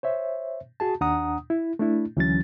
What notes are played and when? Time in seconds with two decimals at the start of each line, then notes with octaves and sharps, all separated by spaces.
0.03 C5 C#5 E5
0.80 F#4 G#4 A5
1.01 D#2 D4 F#5 A#5 D#6
1.50 E4
1.79 A3 D4 E4
2.17 D2 E3 F#3 C#4 A6